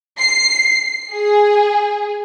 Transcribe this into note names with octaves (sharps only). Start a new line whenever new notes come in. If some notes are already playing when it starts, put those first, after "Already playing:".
C7
G#4